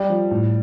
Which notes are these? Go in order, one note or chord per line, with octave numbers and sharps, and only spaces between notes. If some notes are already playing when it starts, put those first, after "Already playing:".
Already playing: G3 G4
F3
A2